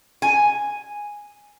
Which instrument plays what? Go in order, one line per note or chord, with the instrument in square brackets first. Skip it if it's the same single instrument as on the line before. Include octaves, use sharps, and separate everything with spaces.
[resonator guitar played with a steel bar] G#5